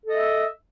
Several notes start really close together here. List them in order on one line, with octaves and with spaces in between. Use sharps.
A4 D#5 E5